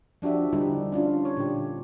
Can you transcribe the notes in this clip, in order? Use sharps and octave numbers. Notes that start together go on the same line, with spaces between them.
F3 D4 F#4 G4 E5
D3 G3 D#4 E4 G4
C#4 D4 F4
C#5
A#2 D3 G4